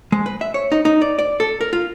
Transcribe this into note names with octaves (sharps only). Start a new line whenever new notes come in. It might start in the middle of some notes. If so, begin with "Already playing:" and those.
G#3
B4
E5
C#5
D#4
D#4
D5
D5
A4
A#4
F4